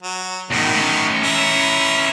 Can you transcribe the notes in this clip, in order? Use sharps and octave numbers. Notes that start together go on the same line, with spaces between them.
F#3
E2 A2 D#3 F#3
A2 C#4
E3 C#4 E5 A#5